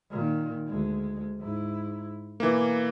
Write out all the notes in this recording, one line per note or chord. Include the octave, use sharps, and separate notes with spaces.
A#2 D#3
D2 G#3
G#2 E4
B2 E3 A#3